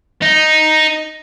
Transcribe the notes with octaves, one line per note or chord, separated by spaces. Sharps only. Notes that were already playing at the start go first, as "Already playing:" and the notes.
D#4